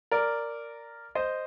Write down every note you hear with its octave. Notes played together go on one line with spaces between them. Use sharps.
A#4 D5
C5 D#5